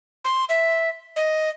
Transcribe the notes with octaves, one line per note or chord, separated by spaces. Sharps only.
C6
E5
D#5